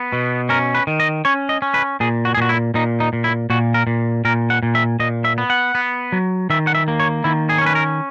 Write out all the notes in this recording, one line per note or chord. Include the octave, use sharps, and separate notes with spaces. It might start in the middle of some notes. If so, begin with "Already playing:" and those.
Already playing: B3
B2
C#4 A#4
B4
D#3
D#5
C#4 C#5
D#5
C#4
B4
A#2 G#4
F#4
G#4
A#2 F#4
E4
A#2 D#4
D#4
A#2
E4
A#2 F#4
A#4
A#2
A#2 A#4
F#5
A#2
E5
A#2 D#5
E5
B3
F#5
B3
F#3
D#3 E5
F#5
E5
A#3
C#5
D#3 E4
G#4
C#5
C#4 B4
A#4